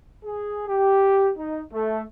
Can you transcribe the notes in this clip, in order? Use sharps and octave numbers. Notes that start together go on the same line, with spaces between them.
G#4
G4
D#4
A3